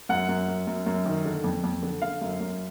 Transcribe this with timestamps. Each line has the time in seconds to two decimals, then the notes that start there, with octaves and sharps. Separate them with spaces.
0.09 F#2 F#5
0.29 F#2
0.48 F#2
0.67 F#2
0.86 F#2
1.06 D#3
1.25 D3
1.44 F2
1.64 F2
1.83 D3
2.02 D3 F5
2.21 F#2
2.41 F#2